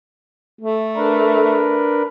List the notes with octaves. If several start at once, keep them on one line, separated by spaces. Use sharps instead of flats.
A3
D4 A#4 B4